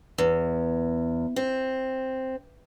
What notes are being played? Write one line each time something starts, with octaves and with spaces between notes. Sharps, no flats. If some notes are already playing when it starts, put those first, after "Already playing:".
E2
C4